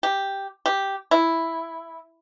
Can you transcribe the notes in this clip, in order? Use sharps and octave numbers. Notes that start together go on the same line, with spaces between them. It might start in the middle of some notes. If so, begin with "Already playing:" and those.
G4
G4
E4